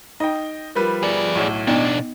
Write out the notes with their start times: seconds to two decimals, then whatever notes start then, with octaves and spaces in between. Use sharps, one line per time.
0.20 D#4 D#5 G5
0.76 F3 G3 A#4 B4
1.03 G#4 D5
1.35 B1 A2 C#5
1.67 B2 B3 D4 D#4 D#5